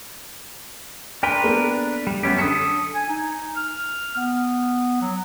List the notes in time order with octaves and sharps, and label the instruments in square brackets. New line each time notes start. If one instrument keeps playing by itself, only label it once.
[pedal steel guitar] D4 A#4 B4 [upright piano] G5 C6
[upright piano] A#3 B3 A4
[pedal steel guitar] G3
[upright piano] F#2 [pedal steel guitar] B3 C#4 G4
[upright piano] D3 B6 C#7 [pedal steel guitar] A4 D#6
[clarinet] G#5
D#4
F6
B3
F#3